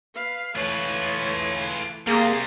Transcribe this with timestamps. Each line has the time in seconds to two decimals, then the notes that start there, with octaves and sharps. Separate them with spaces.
0.15 B4 F5
0.56 E3 A3 F4 B4 C#5
2.07 C3 G3 A#3 G#4 A#5 C6